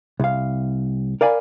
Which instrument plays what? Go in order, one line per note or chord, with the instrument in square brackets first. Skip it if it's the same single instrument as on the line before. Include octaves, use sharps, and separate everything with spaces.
[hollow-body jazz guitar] C2 F5
A#4 D5 F5 G#5 B5